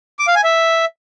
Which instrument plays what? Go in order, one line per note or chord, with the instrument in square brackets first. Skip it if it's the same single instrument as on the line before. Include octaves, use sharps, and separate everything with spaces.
[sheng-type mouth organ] D6
F5
G#5
E5